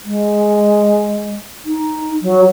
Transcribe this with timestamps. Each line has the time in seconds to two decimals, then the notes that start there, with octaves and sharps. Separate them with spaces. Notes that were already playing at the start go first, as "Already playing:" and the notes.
0.04 G#3
1.65 D#4
2.22 F#3